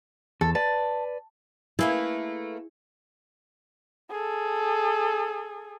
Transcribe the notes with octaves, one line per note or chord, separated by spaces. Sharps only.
E2 A4
B4 D5 A5
A3 A#3 E4 G#4 B4
G#4 A4